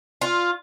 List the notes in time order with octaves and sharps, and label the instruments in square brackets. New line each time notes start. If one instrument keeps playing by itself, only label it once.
[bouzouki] F4